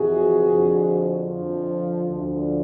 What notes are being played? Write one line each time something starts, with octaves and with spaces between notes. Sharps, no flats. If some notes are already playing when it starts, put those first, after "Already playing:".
Already playing: F2 C3 E3 F#4 G#4
F2 D3 F3
F2 D3 F3
D2 D3 F3